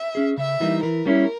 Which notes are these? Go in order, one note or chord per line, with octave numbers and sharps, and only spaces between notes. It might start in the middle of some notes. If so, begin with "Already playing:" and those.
Already playing: E5
C#4 G#4
C#3 E5
E3 G3 A#3 D#4
E3 A#4
G3 A#3 C#4 E4